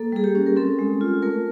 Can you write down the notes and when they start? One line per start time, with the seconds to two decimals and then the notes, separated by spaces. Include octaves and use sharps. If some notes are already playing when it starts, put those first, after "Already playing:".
Already playing: A#3 A4
0.12 G3 G#4
0.24 G4
0.35 C#4
0.46 A#4
0.57 C4 A4
0.79 G#3
1.01 F4
1.22 A3 A#4